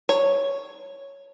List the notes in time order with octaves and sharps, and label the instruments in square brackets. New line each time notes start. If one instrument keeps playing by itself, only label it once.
[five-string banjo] C#5